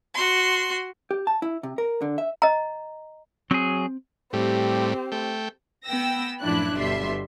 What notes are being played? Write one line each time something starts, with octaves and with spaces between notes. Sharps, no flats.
F#4 C6
G4
A5
E4
C3
A#4
D3
E5
D#5 A#5
F#3 C4 G#4
A2 G3 C4 G4
A3 G5
B3 G5 E6 A#6
F#2 A2 F3 D4 E4 F#6
G1 B2 G3 E5 C6